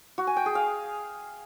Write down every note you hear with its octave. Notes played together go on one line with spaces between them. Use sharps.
F#4
G#5
G5
G#4
F5